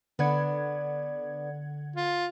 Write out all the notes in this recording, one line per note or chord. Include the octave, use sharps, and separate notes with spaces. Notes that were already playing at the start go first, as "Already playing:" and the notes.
D3 B3 D4 F#5 G#6
F4